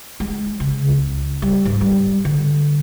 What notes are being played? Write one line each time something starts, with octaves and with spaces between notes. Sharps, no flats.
G#3
C#3
C#2
G3
G#2
G3
D3